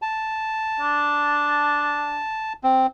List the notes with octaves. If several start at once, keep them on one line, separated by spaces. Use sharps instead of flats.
A5
D4
C4